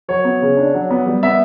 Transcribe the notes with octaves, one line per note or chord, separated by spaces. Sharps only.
F#3 C#5
B3
C#3
D4
F#3
B3
G3
B3 E5